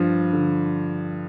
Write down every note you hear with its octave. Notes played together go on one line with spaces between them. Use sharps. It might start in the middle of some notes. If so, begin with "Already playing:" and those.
Already playing: G2 F3
D3